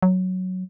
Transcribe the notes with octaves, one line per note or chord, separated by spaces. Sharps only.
F#3